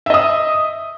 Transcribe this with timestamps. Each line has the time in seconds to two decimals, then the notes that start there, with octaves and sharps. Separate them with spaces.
0.06 E5
0.10 D#5
0.14 D#6